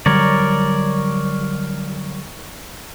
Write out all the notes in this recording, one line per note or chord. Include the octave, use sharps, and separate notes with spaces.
D3 F#3 G3 A#4 C#5 D5